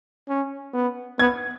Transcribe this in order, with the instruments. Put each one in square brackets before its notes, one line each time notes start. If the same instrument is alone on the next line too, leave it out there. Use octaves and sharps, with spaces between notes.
[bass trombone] C#4
B3
[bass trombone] B3 [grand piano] G#6